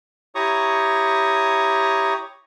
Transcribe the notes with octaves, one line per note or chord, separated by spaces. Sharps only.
E4 G4 C#5 A#5 C#6 D#6